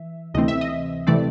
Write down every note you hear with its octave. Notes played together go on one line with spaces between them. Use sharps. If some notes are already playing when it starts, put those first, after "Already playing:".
Already playing: E3 E5
D2 C3 E3 A3 C4 D#5
E5
D#5
C3 E3 A3 C4 D5